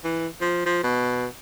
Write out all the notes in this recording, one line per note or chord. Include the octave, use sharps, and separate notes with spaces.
E3
F3
F3
B2